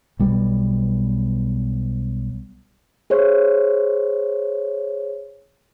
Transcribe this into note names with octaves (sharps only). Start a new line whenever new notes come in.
B1 G3 B3
G#4 C5 C#5